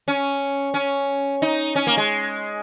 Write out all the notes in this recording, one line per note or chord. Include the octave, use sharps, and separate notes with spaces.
C#4
C#4
D#4
C#4
A#3
G#3